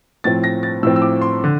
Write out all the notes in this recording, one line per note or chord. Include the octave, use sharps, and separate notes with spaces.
A2 F3 C4 A6
A#6
A6
A2 F3 C4 E6
E6
D6
C6
D3